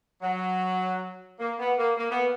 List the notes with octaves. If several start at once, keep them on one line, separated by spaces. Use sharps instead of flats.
F#3
A#3
B3
A#3
A#3
B3